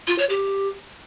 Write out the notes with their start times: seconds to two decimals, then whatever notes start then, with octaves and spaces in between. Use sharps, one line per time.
0.07 F4
0.18 C#5
0.30 G4